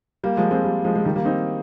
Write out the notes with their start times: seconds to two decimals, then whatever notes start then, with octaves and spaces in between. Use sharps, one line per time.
0.23 G3 A#3
0.37 F3 G#3
0.51 G#3 C4
0.64 G3 A#3
0.85 F3 G#3
0.95 G#3
1.05 D#3 G3
1.16 G3 A#3
1.25 C4 D#4